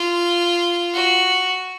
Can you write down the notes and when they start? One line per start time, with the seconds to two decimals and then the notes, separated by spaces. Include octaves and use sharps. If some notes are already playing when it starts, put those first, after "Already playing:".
Already playing: F4
0.94 F#4